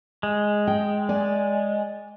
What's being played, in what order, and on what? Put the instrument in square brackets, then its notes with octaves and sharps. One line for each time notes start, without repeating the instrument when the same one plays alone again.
[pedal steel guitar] G#3
[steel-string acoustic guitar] G5
D5 G#5